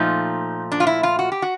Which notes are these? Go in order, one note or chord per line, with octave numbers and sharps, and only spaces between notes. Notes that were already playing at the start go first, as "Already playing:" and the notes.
Already playing: A#2 F3 A3 D#4
D4
F4
E4
F4
F#4
G4
F#4